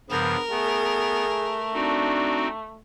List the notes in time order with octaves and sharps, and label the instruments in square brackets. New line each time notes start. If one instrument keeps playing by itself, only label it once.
[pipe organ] G2 C#3 F3 [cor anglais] B3 [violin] A#4
[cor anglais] A3 [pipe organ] B3 [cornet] G#4
[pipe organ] C4 D#4 F#4 [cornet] D4